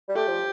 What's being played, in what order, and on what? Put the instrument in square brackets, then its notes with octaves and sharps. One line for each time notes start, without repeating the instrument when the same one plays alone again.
[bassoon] G3
[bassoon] A3 [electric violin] G4
[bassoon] F3